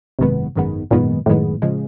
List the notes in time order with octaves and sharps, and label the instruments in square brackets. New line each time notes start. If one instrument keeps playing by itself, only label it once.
[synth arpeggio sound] G#1 F#2 D#3 G#3 B3 [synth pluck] C3
[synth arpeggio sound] G#1 F#2 D#3 G#3 B3
[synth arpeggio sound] G#1 F#2 D#3 G#3 B3 [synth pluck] A#2
[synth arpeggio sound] G#1 F#2 D#3 G#3 B3 [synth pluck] A2
[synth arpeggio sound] C#3 F3 G#3